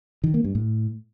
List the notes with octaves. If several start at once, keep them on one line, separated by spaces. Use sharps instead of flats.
D#3
A#3
G2
A2